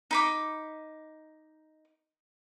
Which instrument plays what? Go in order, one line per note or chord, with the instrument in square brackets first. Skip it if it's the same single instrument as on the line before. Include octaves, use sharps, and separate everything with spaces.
[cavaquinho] D#4 B5 D6